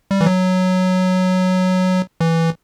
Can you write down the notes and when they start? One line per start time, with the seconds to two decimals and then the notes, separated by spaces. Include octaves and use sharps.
0.11 G3
0.21 E3
0.26 F#3
2.21 E3